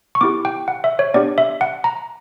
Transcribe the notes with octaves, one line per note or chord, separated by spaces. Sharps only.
C#6
B3 E4 G4 D6
G5
F#5
E5
C#5
B3 D4 G4 D5
E5
F#5
A#5